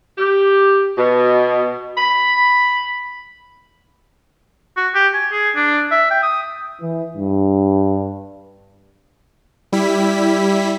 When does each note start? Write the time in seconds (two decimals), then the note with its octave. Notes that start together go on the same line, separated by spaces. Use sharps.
0.18 G4
0.98 B2
1.98 B5
4.77 F#4
4.94 G4
5.14 G#5
5.32 G#4
5.55 D4
5.91 E5
6.11 G5
6.22 D#6
6.82 E3
7.16 G2
9.73 G3 E4 B6